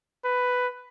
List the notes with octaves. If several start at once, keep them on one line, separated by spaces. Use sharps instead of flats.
B4